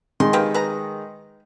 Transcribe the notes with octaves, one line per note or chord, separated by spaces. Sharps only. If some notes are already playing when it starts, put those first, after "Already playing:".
D#3 G#3 C6
A#3 G4 B4
B4 A#5